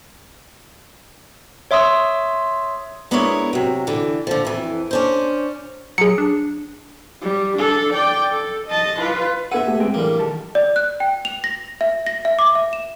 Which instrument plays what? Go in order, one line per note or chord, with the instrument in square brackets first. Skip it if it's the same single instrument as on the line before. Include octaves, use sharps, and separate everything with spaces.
[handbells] C#5 E5 C6 D#6 E6
[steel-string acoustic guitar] G#3 B3 D4 E4 A#4 C#5
C3 F#3
D3 E3
D3 F3
F2 E3
C#4 D4 C5
[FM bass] F#3 [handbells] G#4 C#7
[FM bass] D4
[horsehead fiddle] G3
D4 A4
D5 G5
A4
D#5 A5
F4 B4
[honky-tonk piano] B3 D#7 [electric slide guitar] G#4 F#5 [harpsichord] A4 E5
[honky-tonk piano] A3 B3 G4
[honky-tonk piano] G#3 G#4 [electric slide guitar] C4 B4 G5
[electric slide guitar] A2 D3 E3 [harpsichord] G3 A#3
[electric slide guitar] D#3 G4 A4 [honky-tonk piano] A5
[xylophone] D5
F#6
G5
F7
A#6
E5
A#6
E5
D6
E5
E7